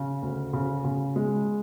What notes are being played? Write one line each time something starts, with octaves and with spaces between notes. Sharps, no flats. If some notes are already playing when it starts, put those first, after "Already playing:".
Already playing: C#3
D2
C#3
C#3
G#3